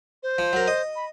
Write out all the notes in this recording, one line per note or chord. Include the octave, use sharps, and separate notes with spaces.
C5
F3
F#3 A#4
D#5
B5